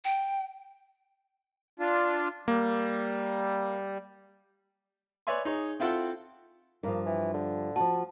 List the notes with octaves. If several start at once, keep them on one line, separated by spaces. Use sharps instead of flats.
G5
D4 F4
G3 A#3
B4 C#5 D5 E5 G#5 C6
D#4 G#4 C#5
C4 E4 F4 A4 F#5 G5
G2 F3 A#3
E3
D3
F3 F#4 A5